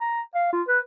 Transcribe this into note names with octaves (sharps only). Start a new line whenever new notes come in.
A#5
F5
F4
B4